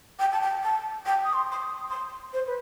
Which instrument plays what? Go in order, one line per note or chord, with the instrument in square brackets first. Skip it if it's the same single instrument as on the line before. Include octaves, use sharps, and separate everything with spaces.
[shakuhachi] G5
A5
G5
A5
G5
D#6
C6
C6
D#6
C6
C5
B4